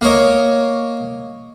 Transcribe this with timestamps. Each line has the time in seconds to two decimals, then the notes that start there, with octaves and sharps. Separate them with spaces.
0.01 A#3 A#4 C#5 D#5